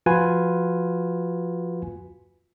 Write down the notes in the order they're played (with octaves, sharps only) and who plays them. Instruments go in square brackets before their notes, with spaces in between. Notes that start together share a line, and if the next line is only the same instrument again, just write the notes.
[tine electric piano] F3 F4 F#4 B4 G#5